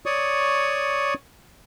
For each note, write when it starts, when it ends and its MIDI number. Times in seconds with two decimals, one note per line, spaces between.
0.06 1.14 73
0.06 1.14 74
0.06 1.14 85
0.06 1.14 87